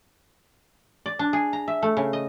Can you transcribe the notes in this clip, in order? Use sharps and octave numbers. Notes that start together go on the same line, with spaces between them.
D5
D4
G#4
A#5
E5
A3
C#3
D#5